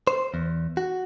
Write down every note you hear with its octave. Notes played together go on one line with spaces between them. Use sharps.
C5
E2
F#4